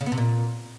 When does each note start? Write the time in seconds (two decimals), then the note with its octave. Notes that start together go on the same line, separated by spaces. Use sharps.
0.01 C#3
0.06 B3
0.12 C3
0.18 A#2